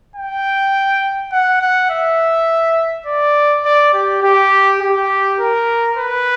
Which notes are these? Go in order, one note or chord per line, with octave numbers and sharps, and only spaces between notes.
G5
F#5
F#5
E5
D5
D5
G4
G4
G4
A#4
B4